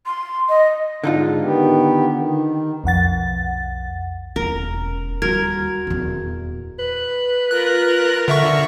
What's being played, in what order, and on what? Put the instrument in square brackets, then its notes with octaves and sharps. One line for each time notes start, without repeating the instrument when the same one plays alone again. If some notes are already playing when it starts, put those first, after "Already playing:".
[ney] C6
D#5
[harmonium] G#2 [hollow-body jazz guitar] D3 D#4 F4
[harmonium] D#3 B3 G4
D#3
[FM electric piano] B1 F2 F#5 A6
[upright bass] E1 C#4 [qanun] A#4
[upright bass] D#2 G3 [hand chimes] F#4 G#6 [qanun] A#4
[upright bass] D#1 E2
[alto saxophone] B4
[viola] F4 A#4 [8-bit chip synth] F#6
[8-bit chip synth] D3 E5 C#6